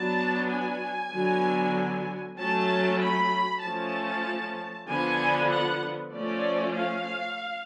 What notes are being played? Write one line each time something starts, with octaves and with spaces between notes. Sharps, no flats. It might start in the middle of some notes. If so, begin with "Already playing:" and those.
Already playing: F#3 B3 D4 A5
G#5
D3 F#3 B3
F#3 A3 C#4 A5
B5
F3 A3 C#4 A5
D3 F3 B3 G#5
F#5
F3 A3 C#4 D5
F5